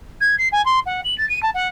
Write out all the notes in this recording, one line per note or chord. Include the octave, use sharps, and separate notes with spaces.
G#6
C7
G#5
C6
F#5
F#7
A6
D#7
A5
F#5